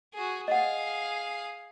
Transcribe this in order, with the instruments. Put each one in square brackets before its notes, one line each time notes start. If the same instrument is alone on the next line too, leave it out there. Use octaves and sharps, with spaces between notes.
[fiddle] F#4 G#4
[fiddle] G#4 F5 [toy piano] D#5 F#5